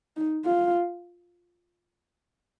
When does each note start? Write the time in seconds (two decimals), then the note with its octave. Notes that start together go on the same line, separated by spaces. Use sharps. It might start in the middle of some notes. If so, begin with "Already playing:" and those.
0.17 D#4
0.46 F4